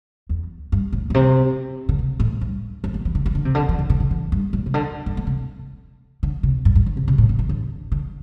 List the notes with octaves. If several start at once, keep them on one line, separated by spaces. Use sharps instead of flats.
E2
G2
A2
A2
C3
D3
C3
A2
G2
G2
A2
E3
D3
E3
D3
C3
D3
E3
D3
C3
D3
E3
G2
A2
C3
D3
G2
A2
C3
D3
C3
G2
G2
D3
C3
C3
A2
D3
E3
D3
D3